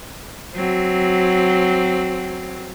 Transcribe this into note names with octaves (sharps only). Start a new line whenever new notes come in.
F#3 C4